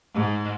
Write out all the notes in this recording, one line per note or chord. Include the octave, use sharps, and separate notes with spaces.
G#2